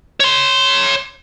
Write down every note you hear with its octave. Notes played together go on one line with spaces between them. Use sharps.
C#5 C6